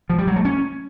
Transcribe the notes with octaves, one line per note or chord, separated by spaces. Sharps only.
F3
G3
F#3
A3
C#4